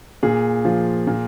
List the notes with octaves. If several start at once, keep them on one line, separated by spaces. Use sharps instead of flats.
A#2 G#4
F3
A#2